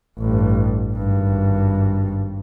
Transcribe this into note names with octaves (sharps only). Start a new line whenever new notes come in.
A1 G2
G#1 G2